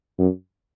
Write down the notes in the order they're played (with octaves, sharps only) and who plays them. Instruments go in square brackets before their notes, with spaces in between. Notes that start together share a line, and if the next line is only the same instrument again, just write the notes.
[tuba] F#2